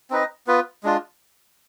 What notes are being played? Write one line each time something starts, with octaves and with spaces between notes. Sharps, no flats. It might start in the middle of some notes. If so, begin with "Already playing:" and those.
C4 D#4 B4 D#5
B3 F4 B4
G#3 D4 F4